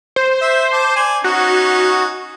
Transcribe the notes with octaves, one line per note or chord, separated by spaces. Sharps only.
C5
E5
A5 D6
D5 G#5
C#4 D#4 F#4